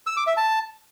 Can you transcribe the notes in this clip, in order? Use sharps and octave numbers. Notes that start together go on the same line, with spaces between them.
E6
D6
E5
A5